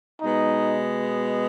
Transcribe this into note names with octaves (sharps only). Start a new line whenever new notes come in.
B2 G#3 B3 D#4